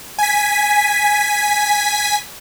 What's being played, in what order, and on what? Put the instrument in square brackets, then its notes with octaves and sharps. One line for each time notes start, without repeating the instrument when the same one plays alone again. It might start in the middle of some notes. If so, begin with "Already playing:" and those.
[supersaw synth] G#5 B6